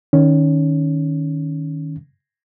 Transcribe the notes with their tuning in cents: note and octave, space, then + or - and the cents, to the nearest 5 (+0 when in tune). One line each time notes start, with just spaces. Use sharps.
D#3 +0 C#4 +10